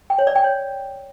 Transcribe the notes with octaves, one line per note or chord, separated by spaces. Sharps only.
G5
C#5
D5
G5
C#5